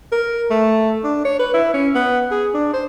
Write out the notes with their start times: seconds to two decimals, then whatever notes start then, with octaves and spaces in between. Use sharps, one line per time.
0.12 A#4
0.51 A3
1.04 D4
1.25 C#5
1.39 B4
1.54 E4
1.74 C#4
1.95 B3
2.31 G#4
2.54 D4
2.74 C5